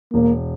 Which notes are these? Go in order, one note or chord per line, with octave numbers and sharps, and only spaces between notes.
E1 A#3